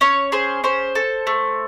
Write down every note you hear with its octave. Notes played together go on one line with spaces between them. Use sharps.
C#4 C#5
G#4 C5
C#4 C5
A4
A3